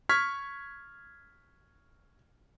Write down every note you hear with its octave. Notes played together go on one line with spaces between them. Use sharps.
C#6 F6 G#6 B6